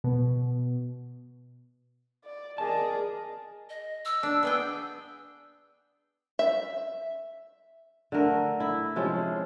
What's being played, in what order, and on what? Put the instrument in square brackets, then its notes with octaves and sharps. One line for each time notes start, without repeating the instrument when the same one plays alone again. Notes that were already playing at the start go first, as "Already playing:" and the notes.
[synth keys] B2
[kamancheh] D5
[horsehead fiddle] G#4 D#5 [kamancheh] A#4 D5 [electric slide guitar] A5
[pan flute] D#5
E6
[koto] D4
B3 G#4 G5
[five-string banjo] E5
[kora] D3 A3 A#4
E4
C3 F3 G#3 C#4